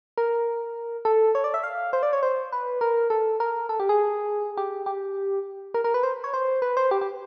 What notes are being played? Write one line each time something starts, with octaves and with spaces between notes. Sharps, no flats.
A#4
A4
C#5
D5
E5
F5
C5
D5
C#5
C5
B4
A#4
A4
A#4
A4
G4
G#4
G4
G4
A#4
A#4
B4
C5
C#5
C5
B4
C5
G4
G4